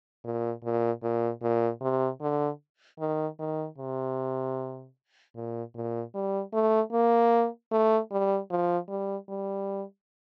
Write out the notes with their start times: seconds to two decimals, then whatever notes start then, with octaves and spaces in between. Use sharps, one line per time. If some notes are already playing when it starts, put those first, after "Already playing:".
0.25 A#2
0.64 A#2
1.03 A#2
1.42 A#2
1.82 C3
2.22 D3
3.00 D#3
3.39 D#3
3.78 C3
5.35 A#2
5.75 A#2
6.15 G3
6.54 A3
6.93 A#3
7.72 A3
8.12 G3
8.50 F3
8.89 G3
9.29 G3